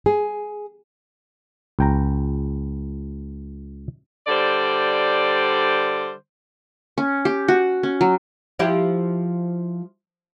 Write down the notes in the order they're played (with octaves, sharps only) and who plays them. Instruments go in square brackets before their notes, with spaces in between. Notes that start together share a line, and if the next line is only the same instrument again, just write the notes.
[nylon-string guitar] G#4
[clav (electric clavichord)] C#2 G5 A#5
[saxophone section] D3 G3 C5 D5
[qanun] C#4
G4
F#4
C#4
F#3
[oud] F3 E4 G4